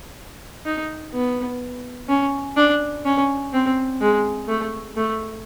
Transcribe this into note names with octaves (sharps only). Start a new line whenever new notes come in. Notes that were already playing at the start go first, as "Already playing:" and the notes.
D#4
B3
C#4
D4
C#4
C4
G#3
A3
A3